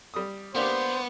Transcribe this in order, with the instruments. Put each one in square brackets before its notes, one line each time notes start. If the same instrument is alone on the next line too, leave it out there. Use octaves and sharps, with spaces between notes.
[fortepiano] G3 D#6
[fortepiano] A#3 D4 G4 [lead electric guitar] B3 [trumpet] C5